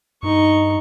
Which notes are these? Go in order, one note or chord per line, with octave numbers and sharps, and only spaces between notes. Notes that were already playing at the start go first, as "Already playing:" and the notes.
G2 D#4 C#6